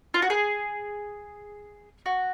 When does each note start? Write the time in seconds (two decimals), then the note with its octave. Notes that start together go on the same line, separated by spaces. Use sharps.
0.14 F4
0.22 F#4
0.30 G#4
2.06 F#4